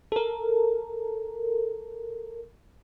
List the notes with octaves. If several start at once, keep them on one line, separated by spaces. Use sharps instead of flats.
A4 A#4